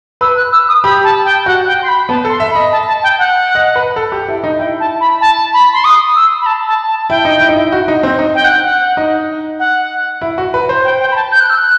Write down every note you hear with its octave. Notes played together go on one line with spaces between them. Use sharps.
B4 E6
F#6
E6
D#6
G4 B5
A5
G5
F#4 F#5
G5
C6
B5
B3 A5
A4
C6
E5
B5
D#5
A5
A5
G5
F#5
D#5
B4
A4
G4
E4
D#4
E4 G5
A5
B5
A5
B5
C6
D#6
E6
B5
A5
A5
A5
E4 G5
D#4
E4
D#4
E4
F#4
D#4
C4
D#4
G5
F#5
F#5
D#4
F#5
E4
F#4
B4
C5
G5
G5
B5
A5
G6
F#6
E6
F#6